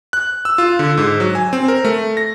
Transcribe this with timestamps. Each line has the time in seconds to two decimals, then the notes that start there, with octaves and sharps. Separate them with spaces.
0.13 F#6
0.45 E6
0.58 F4
0.79 D3
0.97 G#2
1.20 F#3
1.35 G#5
1.53 C4
1.68 A#4
1.85 A3
2.17 A#6